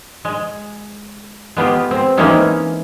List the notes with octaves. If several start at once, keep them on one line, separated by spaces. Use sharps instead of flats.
G#3
G#3 B3 F4 G4
C4
E3 G#3 A#3 C4 C#4 D#4